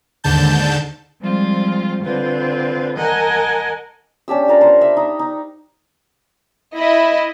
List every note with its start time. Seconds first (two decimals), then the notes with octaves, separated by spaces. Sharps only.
0.24 D#2 G#2 D3 A5 G6
1.21 F3 G3 G#3 C4 F4
2.03 D3 C4 F4 B4
2.97 A#4 D#5 F#5 G#5 A5
4.28 C#4 D4 G4 E6
4.48 F4 A#4 A5
4.61 A#4 C5
4.81 E5 B5
4.97 D#4
5.19 D#4
6.75 E4 D#5